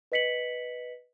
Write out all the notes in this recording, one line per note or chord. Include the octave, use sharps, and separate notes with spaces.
B4 D#5 B6 C#7 F#7